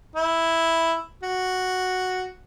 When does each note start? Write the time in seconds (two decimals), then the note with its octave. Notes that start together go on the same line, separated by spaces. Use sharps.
0.15 E4
1.23 F#4